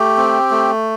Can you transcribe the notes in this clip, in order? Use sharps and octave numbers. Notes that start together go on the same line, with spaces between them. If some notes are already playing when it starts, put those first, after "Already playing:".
Already playing: A3 G4
C4
A3